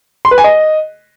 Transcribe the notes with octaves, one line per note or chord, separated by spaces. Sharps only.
C6
B4
G#5
D#5